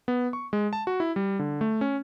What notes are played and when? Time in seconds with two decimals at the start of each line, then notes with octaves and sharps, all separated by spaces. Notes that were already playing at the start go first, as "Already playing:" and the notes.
0.08 B3
0.33 C#6
0.53 G#3
0.73 A5
0.87 F#4
1.00 E4
1.16 G3
1.39 D3
1.61 A3
1.81 C#4